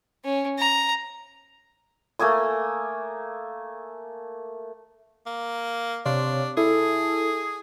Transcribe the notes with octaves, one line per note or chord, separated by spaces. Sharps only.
C#4
A#5
A3 A#3 G#5 D#6
A#3
C3 D4 C#5 F5 C6
E4 G#4 A4